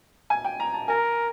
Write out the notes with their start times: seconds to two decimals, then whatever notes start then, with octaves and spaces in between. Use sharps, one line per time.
0.30 G#5
0.44 G5
0.60 A#5
0.74 A5
0.88 A#4 G#5